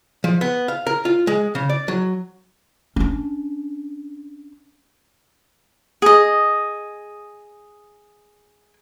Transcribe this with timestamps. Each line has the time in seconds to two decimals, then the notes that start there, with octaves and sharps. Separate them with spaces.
0.24 F3
0.41 B3
0.68 F5
0.87 A#4
1.05 F4
1.27 G#3
1.55 C#3
1.69 D5
1.88 F#3
2.96 C#4 D4
6.02 G#4 D#5